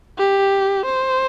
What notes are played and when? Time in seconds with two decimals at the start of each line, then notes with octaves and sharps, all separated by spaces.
0.18 G4
0.86 C5